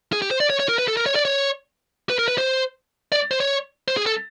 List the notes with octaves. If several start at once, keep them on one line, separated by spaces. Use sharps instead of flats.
G#4
G4
C5
D5
C#5
C#5
A#4
B4
A4
A#4
C#5
D5
C#5
B4
A#4
B4
C5
D5
C5
C#5
C5
G#4
A4